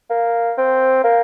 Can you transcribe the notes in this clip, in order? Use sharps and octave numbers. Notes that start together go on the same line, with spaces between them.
A#3
C4
A#3